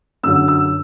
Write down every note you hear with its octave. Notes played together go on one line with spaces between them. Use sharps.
F#2 D3 F#3 E6
E6